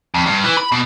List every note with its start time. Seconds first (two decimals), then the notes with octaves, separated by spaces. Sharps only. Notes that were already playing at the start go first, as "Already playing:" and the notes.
0.14 F2
0.26 G2
0.44 E3
0.57 B5
0.72 B2